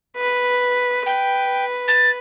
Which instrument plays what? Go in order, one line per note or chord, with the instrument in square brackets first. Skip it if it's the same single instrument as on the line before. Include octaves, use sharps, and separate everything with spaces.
[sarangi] B4
[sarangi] B4 [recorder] G5
[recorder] A6